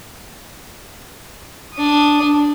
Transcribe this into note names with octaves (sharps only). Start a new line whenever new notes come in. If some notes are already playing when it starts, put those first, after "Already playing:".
D4 D#6